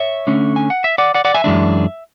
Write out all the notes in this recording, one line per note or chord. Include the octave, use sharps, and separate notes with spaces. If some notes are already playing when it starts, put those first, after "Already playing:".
Already playing: C#5 E5
D3 A3 C#4
G#5
F#5
E5
D5 F#5
D5 F#5
D5 F#5
E5 G#5
F#2 E3 G#3 D4